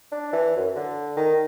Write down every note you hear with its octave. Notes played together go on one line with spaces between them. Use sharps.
D4
E3
F#2
D3
D#3